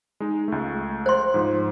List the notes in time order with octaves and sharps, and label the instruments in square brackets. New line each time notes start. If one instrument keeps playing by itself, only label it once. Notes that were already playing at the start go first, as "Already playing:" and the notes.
[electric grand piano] G#3 D#4
C#2 A3
[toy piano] C5 C6
[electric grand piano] G#2 F3